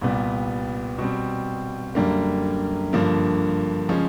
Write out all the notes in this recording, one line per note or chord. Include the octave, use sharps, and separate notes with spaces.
C2 A#2 G3 B3
B2 G3 C4
F#2 D3 G3 A#3
G2 D3 F3 A#3
C#3 F3 G#3 C#4